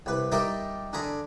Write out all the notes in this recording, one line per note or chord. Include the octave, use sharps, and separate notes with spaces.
C2 B4
G3 D#4 A#4 D5 E5
D3 G#4 A#5 B5